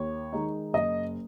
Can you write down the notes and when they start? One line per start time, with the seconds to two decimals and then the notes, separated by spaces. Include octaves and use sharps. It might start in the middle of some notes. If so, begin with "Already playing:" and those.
Already playing: D#2 C#5
0.33 D#3 G#3 D#4
0.73 F#1 D#5